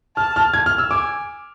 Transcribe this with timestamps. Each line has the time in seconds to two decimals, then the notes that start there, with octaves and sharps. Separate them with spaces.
0.17 A5 F6
0.36 F6
0.54 G#6
0.66 F6
0.78 E6
0.91 G#5 D6